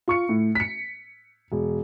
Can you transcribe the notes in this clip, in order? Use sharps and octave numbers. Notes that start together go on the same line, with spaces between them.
F4 C#6 C#7
A2
B6 C#7
E1